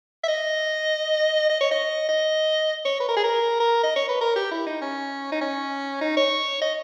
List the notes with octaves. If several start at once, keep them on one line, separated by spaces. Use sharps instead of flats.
E5
D#5
D#5
C#5
D#5
D#5
C#5
B4
A#4
G#4
A#4
A#4
D#5
C#5
B4
A#4
G4
E4
D#4
C#4
D#4
C#4
D#4
C#5
D#5